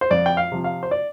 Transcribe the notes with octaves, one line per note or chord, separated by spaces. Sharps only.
C5
F2 D5
G5
F5
C3 F3
F5
C5
D5